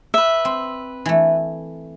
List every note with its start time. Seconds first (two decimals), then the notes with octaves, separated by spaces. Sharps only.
0.14 B4 E5
0.45 C4
1.06 E3 A3